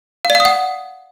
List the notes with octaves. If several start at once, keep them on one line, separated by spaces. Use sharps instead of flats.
F5
D5
F5
D#6
F#5